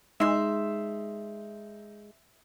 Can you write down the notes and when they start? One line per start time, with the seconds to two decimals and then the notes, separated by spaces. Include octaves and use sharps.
0.20 G#3 D#4 E5 C6